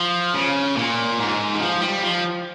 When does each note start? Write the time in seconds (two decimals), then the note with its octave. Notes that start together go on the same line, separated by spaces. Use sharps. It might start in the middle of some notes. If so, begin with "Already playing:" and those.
Already playing: F3
0.34 C#3
0.76 A#2
1.19 G#2
1.55 D#3
1.59 F3
1.81 G3
2.01 F3